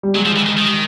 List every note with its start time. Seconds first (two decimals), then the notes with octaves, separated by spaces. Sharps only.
0.03 G3
0.15 F#3 G#3
0.25 F3
0.36 E3
0.46 D#3
0.57 D#3